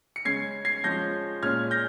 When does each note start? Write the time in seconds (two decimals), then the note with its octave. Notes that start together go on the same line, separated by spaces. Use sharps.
0.16 C#7
0.25 C#3 G#3 C#4 G#6 C7
0.65 G#6 C7
0.84 F3 G#3 C#4 G6 A#6
1.42 A#2 G#3 C#4 F6 G#6
1.71 G6 A#6